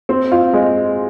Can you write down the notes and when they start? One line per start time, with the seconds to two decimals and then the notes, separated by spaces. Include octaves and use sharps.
0.09 C4
0.32 F4
0.53 G#3